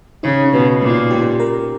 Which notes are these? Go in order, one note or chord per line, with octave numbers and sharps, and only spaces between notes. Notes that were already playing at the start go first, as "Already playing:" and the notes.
C#3 D#4
C#4
B2
A#2
D#4
G4
A#4